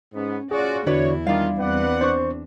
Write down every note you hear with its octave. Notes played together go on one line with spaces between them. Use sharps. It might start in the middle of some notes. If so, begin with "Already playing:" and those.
G#2 B3 C#4
C#4 F4 F#4 G#4 D5
E2 D3 D4 E4 F#4 B4 C#5 D5
D#3 G3 G#3 D4 F4 F5
E2 C4 B4 D5 F#5
D4 C5 C#6